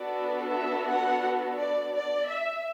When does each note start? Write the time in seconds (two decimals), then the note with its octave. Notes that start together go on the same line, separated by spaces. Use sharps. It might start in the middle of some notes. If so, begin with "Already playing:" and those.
Already playing: B3 D4 F#4 A4 D5
0.52 E5
0.87 F#5
1.58 D5
1.94 D5
2.28 E5